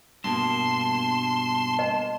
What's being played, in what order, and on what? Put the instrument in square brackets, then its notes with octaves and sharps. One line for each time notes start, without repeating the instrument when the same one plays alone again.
[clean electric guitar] G2 B2 A#3 [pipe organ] A5 [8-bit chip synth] C6
[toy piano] D#5